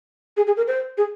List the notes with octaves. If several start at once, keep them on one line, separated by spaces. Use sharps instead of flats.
G#4
G#4
A#4
C5
G#4